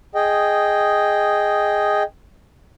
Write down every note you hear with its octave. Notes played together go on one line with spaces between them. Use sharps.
G#4 D#5 G5